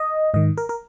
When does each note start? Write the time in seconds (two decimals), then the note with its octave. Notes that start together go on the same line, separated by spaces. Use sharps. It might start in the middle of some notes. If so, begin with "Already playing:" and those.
Already playing: D#5
0.34 G#2 D#3 D#5
0.58 A#4
0.69 A#4